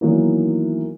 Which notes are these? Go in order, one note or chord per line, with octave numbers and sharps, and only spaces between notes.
D#3 E3 F#3 A#3 B3 D#4